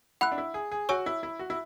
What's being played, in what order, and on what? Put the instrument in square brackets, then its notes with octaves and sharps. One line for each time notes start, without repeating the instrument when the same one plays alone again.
[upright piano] E4 [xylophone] F#5 B5 F#6
[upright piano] D4
E4
G#4
G#4
[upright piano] F#4 [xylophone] C#5 G#5 C#6 E6
[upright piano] E4
E4
F#4
E4